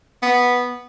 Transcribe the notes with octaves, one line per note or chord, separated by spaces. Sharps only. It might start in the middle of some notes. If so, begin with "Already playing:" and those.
B3